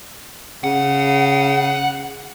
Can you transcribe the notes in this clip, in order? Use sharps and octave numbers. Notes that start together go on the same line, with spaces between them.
C#3 F#5